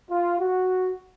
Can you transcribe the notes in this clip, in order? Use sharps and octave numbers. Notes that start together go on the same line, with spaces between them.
F4
F#4